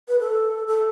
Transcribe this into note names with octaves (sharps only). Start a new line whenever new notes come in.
B4
A4
A4